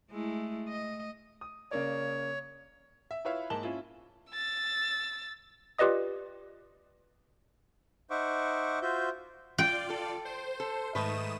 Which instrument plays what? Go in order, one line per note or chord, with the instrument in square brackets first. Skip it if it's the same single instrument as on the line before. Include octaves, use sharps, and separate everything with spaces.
[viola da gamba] G#3 A3 E4
D#5
[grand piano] D#6
[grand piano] C#3 A#3 D5 [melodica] C#5
[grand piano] E5
E4 F4 B4 C#5 E5 F5
G#2 A#3 A5 E7 F#7 G7
C#4 E4 F4
[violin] E6 A6
[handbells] F4 G4 B4 D5 D#5 D#6
[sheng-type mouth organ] D#4 C5 E5 F#5 C#6 D6
F4 F#4 C5 E5 G6
[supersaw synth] F4 D5 [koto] G5
[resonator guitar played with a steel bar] A4
[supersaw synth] C5
[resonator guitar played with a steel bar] A4
[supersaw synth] G#2 D#6 E7 [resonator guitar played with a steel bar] D#3 A3 B4